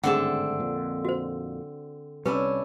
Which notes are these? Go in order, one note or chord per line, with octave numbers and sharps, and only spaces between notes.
G#1 G2 D3 A3 C4 G#4 F#5 A5
F2 A#2
F#4 C5
C2 C3 G3 C#4 D4 E4 B4